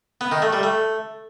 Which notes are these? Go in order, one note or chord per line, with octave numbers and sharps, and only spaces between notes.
B3
D#3
A3
G3
A3